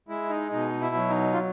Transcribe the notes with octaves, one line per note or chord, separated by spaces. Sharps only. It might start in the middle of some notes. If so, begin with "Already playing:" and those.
G#3 E4
D#4
B2 D#4
E4
F#3
D#4
F4